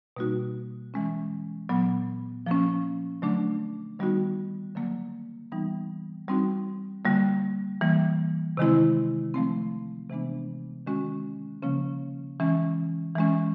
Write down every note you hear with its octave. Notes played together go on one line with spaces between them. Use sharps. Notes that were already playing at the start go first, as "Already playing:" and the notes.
B2 G3 A#3 D#4 F#4
E3 G#3 C#4
A#2 F#3 B3
F3 A#3 C#4
D3 F#3 A3 D4
D#3 G3 B3 D#4 F#4
D3 F#3 A#3
E3 G3 B3 D#4
G3 C4 D#4 F#4
D3 G3 A#3
E3 G3 A#3
C3 D#3 G#3 C4 E4
F3 A3 C4
C3 E3 G#3 B3 D4
D#3 G#3 C#4 F#4
C#3 F3 A#3 C#4
E3 G#3 C#4
E3 G#3 C#4